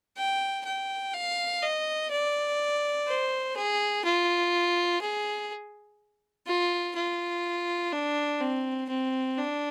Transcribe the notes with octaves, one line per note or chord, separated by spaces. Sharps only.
G5
G5
F5
D#5
D5
C5
G#4
F4
G#4
F4
F4
D4
C4
C4
D4